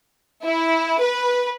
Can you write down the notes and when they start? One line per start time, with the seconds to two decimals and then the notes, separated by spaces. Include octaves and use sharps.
0.45 E4
1.01 B4